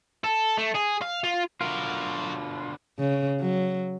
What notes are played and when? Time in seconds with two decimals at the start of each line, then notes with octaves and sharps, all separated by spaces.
0.24 A4
0.57 A3
0.75 G#4
1.02 F5
1.24 F4
1.61 B2 D3 F#3 F4 A#4
2.99 C#3
3.40 F#3